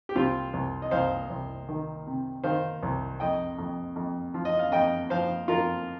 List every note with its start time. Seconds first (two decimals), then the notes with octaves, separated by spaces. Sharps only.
0.09 G4
0.15 C2 C4 F4
0.53 C2
0.82 D#5
0.91 C2 C5 F5
1.30 C2
1.69 D#3
2.07 C3
2.44 D#3 C5 F5
2.83 C2
3.20 F2 D#5 G5
3.58 F2
3.96 F2
4.34 F3
4.45 D#5
4.59 F5
4.72 F2 D#5 G5
5.10 F3 C5 F5
5.48 F2 F4 A#4